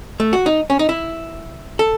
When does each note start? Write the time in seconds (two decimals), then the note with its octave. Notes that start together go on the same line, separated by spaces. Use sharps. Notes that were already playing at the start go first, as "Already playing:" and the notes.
0.20 A3
0.33 F#4
0.46 D#4
0.70 C#4
0.79 D#4
0.89 E4
1.79 A4